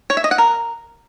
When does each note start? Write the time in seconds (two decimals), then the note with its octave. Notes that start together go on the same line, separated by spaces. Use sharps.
0.10 C#5
0.17 E5
0.24 D#5
0.31 F#5
0.38 A#4